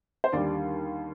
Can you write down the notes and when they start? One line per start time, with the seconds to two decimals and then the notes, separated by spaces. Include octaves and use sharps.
0.24 C5
0.33 D#2 D3 G3 D5